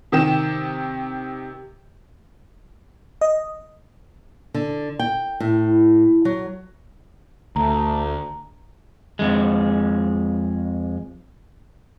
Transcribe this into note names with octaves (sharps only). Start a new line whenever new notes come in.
C3 D#3 G4 E7
D#5
D3
G5
A2
F#3
D2 A3 A#5
F2 G#3